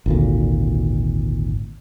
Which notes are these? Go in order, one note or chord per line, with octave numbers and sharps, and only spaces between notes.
G#1 D2 A#2